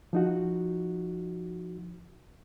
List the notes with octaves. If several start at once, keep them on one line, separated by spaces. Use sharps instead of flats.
F3 D#4 F#4